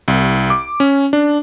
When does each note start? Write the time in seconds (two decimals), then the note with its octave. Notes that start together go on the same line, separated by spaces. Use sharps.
0.08 C2
0.50 D6
0.80 C#4
1.13 D4